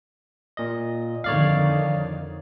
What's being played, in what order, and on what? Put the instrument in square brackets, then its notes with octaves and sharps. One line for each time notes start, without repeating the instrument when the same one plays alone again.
[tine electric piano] A#2 D#5
[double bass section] F2 D3 D#3 [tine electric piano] C#5 D5 F5